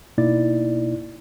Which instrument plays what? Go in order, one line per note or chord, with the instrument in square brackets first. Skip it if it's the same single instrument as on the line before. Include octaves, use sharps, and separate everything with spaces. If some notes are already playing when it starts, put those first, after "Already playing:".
[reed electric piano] B2 A#3 D#4 E4 D5 A6